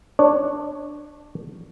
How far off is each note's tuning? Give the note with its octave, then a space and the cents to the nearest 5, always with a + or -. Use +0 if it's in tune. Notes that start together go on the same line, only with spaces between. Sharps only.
D4 +5 C#5 +0